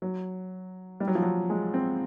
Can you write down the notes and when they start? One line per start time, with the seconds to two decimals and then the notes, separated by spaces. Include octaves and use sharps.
0.02 F#3
1.00 G3
1.07 F#3
1.15 F3
1.22 F#3
1.50 G#3
1.74 C4